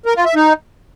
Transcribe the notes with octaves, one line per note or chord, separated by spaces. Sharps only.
A#4
F4
E5
D#4